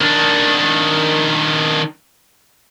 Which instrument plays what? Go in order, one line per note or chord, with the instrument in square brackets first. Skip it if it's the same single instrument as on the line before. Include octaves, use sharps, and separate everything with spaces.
[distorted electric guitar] D#3 D4